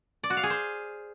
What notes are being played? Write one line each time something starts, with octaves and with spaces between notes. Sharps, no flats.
D5
F#4
F5
G#4
C5